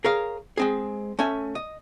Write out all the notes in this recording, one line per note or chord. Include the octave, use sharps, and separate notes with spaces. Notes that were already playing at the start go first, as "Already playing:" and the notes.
G#4 A#4 C#5 F5
G#3 C4 G#4
A3 C#4 E5 G#5
D#5